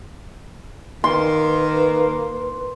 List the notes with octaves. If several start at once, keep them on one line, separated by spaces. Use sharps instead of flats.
D#3 A#3 B4 C6